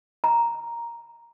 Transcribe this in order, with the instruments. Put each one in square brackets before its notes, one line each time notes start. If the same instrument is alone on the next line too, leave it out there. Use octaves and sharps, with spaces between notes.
[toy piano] A#5